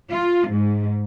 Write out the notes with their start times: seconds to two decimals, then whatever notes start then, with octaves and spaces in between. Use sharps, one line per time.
0.11 F4
0.49 G#2